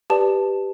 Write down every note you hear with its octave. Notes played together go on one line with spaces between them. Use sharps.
G4 B4 D5 A5